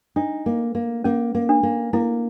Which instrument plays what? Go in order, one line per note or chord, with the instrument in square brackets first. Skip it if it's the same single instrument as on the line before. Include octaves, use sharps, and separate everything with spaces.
[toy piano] D4 [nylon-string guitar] D#4
[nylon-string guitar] A#3
A#3
[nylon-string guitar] A#3 [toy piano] C#4
[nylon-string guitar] A#3
[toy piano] D4
[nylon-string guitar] A#3
[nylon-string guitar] A#3 [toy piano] E4